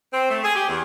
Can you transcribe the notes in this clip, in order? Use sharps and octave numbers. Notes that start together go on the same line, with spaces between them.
C4
A3
G#4
G4
E2